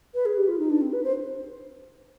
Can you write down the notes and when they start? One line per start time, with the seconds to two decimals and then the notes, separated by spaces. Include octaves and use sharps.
0.14 B4
0.25 G#4
0.37 G4
0.48 F4
0.59 D#4
0.70 D4
0.81 C4
0.92 B4
1.04 C5